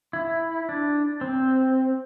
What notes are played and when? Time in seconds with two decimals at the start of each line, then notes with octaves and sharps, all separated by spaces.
0.13 E4
0.69 D4
1.21 C4